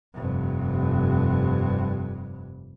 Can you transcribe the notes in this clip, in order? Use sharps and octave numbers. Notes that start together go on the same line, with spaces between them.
F1 G2